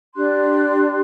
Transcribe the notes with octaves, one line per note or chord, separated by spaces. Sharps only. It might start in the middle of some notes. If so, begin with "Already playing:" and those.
D4 G4 C6 F#6